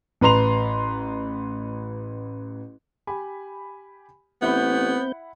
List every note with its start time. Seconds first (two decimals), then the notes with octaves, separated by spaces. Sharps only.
0.21 A1 B4 A#5 C6 F7
3.07 G4 G#5 B5
4.42 A1 B3 C4 E4 F#5 B5 G6